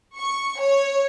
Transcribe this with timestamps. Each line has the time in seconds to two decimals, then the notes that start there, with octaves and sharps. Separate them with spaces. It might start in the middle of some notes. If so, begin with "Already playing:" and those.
0.17 C#6
0.60 C#5